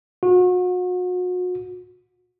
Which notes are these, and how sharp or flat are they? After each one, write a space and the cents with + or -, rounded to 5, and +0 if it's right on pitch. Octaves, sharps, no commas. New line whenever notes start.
F#4 -35